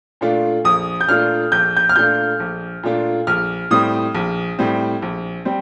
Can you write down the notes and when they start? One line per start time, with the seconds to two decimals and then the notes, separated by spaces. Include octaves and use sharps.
0.21 A#2 A3 D4 F4
0.65 A#1 D#6
1.01 G6
1.08 A#2 A3 D4 F4 F6
1.52 A#1 G6
1.77 G6
1.89 F6
1.96 A#2 A3 D4 F4 G6
2.40 A#1
2.83 A#2 A3 D4 F4
3.27 A#1 F6
3.71 A2 G3 C4 D#6
4.14 A#1
4.59 A2 G3 C4
5.02 A#1
5.45 G3 C4